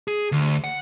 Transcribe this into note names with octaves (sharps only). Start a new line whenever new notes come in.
G#4
D2
F#5